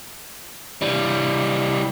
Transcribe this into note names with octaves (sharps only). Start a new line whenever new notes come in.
E3 G3